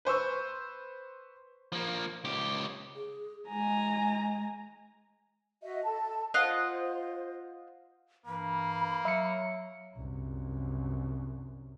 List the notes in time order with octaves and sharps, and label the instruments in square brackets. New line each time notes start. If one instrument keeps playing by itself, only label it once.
[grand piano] B4 C5 C#6 E6
[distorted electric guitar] F3 A#3
C#2 G4
[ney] G#4
[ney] G#3 [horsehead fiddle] G#5 A#5
[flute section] F#4 D#5 E5
A4 A5
[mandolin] F4 D#5 F#5 [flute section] C5
[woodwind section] G2 E3 [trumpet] A#3 [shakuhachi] B5
[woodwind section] F#3 [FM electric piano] E5 C#7
[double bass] C2 F#2